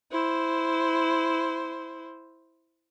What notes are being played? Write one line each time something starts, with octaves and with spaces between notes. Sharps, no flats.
E4 C5